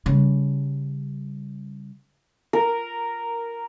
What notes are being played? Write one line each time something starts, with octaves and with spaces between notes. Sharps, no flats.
C#3 G3
A#4